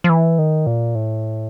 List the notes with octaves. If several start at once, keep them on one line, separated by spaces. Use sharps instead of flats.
F3
E3
D#3
A#2
A2